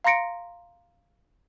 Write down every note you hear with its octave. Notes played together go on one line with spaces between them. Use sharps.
F5 A#5 C6 A#6 C#7 D7